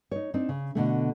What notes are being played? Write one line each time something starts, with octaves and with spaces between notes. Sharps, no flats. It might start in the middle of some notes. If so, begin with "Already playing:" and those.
D#4 C#5
C4 D4 D#4
C#3
B2 D3 A3